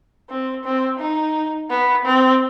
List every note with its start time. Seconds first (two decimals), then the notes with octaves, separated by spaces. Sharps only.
0.29 C4
0.64 C4
0.99 D#4
1.70 B3
2.05 C4